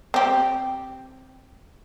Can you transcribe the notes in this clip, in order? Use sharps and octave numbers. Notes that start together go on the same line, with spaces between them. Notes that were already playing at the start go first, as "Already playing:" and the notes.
C4 G4